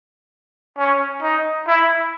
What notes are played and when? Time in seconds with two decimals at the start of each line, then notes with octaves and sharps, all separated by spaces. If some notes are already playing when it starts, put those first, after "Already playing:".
0.78 C#4
1.22 D#4
1.67 E4